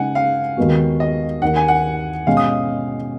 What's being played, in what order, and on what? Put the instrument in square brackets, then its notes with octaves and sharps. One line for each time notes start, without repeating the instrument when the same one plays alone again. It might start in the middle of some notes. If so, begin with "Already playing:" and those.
Already playing: [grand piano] C#3 G#3 D#4 [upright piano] F#5 G#5
[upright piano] F5
[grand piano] D#2 D#3 G#3 B3 F#4
[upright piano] D#5
[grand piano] D#2 D#3 A#3 [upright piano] F#5
[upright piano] G#5
F#5
[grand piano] B2 G#3 C#4 [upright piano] F5
[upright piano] D#6